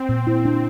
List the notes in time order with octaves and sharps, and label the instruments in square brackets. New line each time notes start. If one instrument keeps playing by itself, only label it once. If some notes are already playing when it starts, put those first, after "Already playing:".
Already playing: [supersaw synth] C4
[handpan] A#2
E4
D4